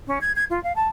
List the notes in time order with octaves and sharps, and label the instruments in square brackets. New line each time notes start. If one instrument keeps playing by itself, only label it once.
[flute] C#4
G#6
G#6
F4
F5
A5